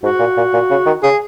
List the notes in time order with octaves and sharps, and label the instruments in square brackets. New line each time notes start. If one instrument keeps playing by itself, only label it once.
[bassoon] G#2 [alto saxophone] F#4
[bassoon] A#2
A#2
A#2
C#3
D#3
[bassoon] C#3 [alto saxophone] G#4